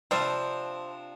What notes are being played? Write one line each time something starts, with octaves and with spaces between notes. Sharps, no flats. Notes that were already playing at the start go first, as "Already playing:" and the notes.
C3 F3 G3 C4 D4